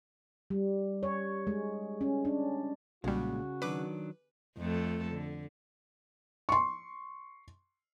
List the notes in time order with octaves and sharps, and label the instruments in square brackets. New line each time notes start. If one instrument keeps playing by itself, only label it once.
[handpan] G3
C#5
G#3
C#4
D4
[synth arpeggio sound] B1 G3 [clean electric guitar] A#2 G#3 [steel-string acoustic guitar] C#3 [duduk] F#4
[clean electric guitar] D#3 F#3 D4 [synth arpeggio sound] B4 D6
[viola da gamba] F2 A3 A4
D3
[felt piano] C6 C#6